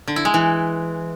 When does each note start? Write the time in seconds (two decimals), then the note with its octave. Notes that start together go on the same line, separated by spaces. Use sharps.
0.08 D3
0.16 E4
0.25 G#3
0.34 E3